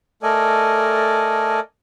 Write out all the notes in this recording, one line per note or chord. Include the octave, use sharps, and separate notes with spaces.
A3 A4 A#4 D5 D#5 G#5